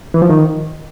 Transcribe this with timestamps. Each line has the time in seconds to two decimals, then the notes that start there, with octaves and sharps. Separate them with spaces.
0.14 E3
0.22 F3
0.30 D#3